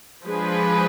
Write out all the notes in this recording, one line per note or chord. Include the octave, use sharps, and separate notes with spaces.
F3 G#3 D4 G#4 B4